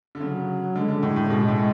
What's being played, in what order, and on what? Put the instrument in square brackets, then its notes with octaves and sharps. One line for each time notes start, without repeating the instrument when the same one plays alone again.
[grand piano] D3
[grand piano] C#3 [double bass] F#3
[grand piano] D3 [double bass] G#3
[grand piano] D3
A2
A2
C#3
[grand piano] B2 [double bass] G#3
[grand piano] A2